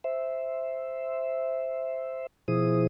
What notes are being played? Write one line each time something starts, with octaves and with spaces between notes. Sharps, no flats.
C5 E5
B2 F3 E4 G#4 C5 D#6